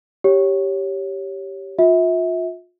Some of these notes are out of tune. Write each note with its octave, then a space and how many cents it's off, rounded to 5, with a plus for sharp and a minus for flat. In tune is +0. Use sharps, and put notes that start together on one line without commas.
G4 -5 C#5 +0
F4 +35 E5 -30